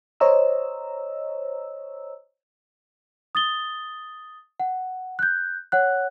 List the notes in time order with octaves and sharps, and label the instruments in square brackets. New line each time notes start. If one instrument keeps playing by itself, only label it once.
[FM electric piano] C5 C#5 D#5 A#5 E6
[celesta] D#6 A6 G7
F#5
F#6 G6
C#5 F#5 F#6